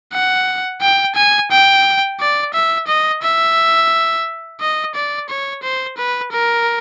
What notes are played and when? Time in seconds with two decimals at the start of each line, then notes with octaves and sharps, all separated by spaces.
0.13 F#5
0.81 G5
1.16 G#5
1.51 G5
2.20 D5
2.54 E5
2.88 D#5
3.23 E5
4.60 D#5
4.95 D5
5.30 C#5
5.63 C5
5.98 B4
6.32 A#4